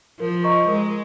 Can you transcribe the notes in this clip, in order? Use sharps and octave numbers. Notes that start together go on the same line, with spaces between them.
F3 A#4
D#5 A#5 C#6
G#3 A#4